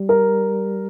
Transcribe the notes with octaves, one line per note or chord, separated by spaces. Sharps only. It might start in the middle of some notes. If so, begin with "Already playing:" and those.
Already playing: G3
A#4